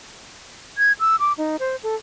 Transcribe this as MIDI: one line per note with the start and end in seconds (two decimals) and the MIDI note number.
0.78 0.92 92
1.00 1.16 88
1.20 1.33 86
1.38 1.57 63
1.59 1.76 72
1.83 1.95 69